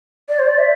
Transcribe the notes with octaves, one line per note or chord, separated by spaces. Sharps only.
D5
C5
D5
E5